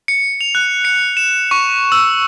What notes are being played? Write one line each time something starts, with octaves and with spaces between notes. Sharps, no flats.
C#7
F7
F#6
C#7
E7
C#6
E6